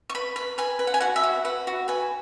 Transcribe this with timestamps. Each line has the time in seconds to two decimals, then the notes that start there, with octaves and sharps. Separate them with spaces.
0.10 C#6
0.15 B4 B5
0.36 B4
0.58 B4 G#5
0.79 B4
0.87 F#5
0.94 G#5
1.01 F#4 F#5
1.16 E5
1.23 F#4
1.45 B4 F#5
1.67 F#4
1.88 B4 G#5